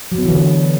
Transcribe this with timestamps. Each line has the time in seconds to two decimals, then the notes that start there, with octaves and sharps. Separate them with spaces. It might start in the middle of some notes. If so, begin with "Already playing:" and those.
0.12 F#3
0.18 B3
0.25 E3
0.32 D3